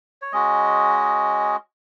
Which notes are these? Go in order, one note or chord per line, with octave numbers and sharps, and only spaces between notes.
C#5
G#3 C#4 F#4 D#5